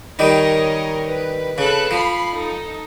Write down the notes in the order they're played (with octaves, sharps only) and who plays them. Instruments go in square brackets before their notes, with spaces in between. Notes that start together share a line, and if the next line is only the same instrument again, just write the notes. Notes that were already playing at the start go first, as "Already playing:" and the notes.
[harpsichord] D#3 G3 D#4 [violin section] A#4 C#5 D#5
[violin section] B4
[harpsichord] C#3 [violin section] A4 B4 F#6
[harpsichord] F3 [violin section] B5 C7
[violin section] D#4 A4